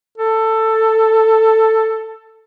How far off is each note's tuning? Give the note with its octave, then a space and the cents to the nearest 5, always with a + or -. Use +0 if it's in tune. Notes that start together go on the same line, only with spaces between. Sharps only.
A4 +10